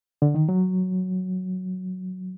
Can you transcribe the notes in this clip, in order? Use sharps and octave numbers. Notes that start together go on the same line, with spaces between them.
D3
D#3
F#3